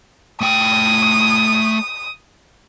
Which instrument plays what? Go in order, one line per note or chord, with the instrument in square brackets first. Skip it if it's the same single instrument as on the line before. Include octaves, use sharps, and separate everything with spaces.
[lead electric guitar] A3 G5 [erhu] D#6